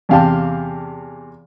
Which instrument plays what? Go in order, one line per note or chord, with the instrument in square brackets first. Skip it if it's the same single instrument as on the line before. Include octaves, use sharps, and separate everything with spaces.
[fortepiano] E2 C3 F5 G5 A5